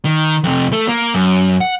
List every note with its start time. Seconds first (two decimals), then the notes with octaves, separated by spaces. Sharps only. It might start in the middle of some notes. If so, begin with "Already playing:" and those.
0.05 D#3
0.44 F2 C3
0.73 A3
0.88 A#3
1.15 F#2
1.61 F#5